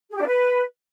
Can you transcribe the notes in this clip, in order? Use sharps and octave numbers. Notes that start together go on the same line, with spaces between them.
G#4
G4
D4
B4